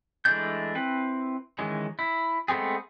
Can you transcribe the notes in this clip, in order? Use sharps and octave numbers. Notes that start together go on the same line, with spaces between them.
E3 G#3 A3 D4 G6
C4 E4 B4
D#3 E3 G#3 C#4
E4
G#3 A3 B3 C4 G#4